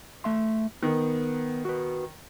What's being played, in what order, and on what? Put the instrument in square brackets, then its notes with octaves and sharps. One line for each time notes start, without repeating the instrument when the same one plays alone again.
[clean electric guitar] A3 E5 C6
[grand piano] D#3 [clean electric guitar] B3
[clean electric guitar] F#4 B4